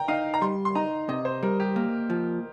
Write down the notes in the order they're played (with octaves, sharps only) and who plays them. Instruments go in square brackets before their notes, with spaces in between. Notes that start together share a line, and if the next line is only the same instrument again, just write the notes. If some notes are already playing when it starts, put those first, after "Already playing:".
Already playing: [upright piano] G5 A#5
[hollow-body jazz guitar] D#4 [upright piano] F5
[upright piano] A#5
[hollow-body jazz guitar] G3 [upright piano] C6
[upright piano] C6
[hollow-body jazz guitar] D#4 [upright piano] A#5
[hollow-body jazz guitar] C3 [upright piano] D#5
[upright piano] C5
[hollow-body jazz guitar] G3 [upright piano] A#4
[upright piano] G4
[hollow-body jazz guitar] A#3
F3